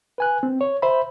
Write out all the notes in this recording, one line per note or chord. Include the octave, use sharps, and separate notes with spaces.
B4 G#5 F#6
C4
C#5
C5 E5 B5